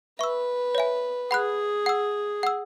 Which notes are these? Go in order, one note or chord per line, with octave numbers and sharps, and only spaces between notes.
B4 E5 C#6 E6
C#5 E5 G#5
G#4 F#5 B5 F#6
F#5 E6
F#5 E6